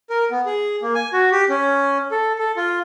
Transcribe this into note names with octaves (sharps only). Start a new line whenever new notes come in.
A#4
B3
G#4
A#3
G#5
F#4
G4
C#4
A4
A4
F4